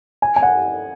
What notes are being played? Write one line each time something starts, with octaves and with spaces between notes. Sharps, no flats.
G#5
G#5
F#5